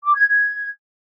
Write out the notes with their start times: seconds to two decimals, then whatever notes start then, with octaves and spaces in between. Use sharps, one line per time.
0.03 D6
0.15 G#6
0.26 G#6